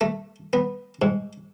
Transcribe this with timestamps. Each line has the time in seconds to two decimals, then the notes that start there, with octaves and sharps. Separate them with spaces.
0.01 A3
0.53 B3
1.02 G#2